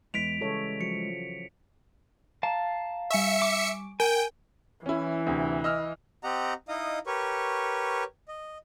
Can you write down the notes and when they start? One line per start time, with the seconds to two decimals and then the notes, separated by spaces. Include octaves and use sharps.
0.14 E2 E3 G#3 B6 D7 F7
0.41 C#3 E3 G3 A4 C#5
0.81 F3 F#3 C#7
2.43 F5 A5 A#5
3.10 G3 E5 G#5 C#6 C#7
3.42 D6
4.00 A#4 G5 G#5
4.86 E3 C#4 E4
5.27 D2 C3
5.64 D#5 E6 F6
6.23 C4 G4 D#5 F#5 A#5
6.68 D#4 E4 D#5 F5 D#6
7.07 G4 A#4 B4 C#5 C#6
8.28 D#5